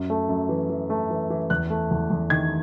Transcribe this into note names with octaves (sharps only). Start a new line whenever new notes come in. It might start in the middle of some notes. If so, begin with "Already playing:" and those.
Already playing: F#2
A3
F#2
E3
E3
A3
E3
E3
E2 F#6
A3
E2
E2
D#3 G#6